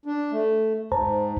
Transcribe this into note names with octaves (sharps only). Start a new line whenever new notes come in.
D4
A3
G#2 C5 A5 A#5